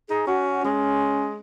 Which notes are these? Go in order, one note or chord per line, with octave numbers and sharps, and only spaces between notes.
D#4 G#4
C#4 F#4
G#3 C#4